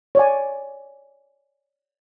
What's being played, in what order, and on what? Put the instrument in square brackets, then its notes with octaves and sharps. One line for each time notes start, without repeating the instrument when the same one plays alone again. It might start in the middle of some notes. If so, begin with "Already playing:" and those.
[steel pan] C#5 D5 G#5